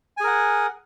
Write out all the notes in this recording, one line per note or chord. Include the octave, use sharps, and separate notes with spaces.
G#4 A#4 F#5 G#5